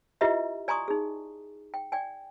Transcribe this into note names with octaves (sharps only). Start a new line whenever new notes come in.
E4 F4 G4 B4 D#5 E5
D5 G#5 A#5 C6 C#6 D#6
D#4 G#4
G5
D5 G5 G#5